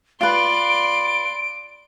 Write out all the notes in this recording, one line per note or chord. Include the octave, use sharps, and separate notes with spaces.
F4 B4 D5 C6 D7